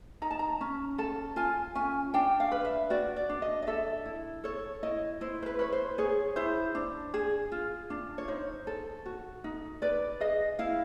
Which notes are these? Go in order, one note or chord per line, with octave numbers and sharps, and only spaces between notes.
D#4 A#5
A5
A#5
C#4
A4 A5
F4 G#5
C#4 G#5
D4 G5
F5
B4
E5
F#4 D5
D5
D4
D#5
D#5
A4 E5
E4
A4 C#5
E4 D#5
E4 C5
C5
B4
B4 C#5
C5
G#4 C#5
E4 C5
D4
G#4
F4
D4
C#5
D#4 C5
A4
F#4
D#4
B4 D5
G#4 D#5
E4 F5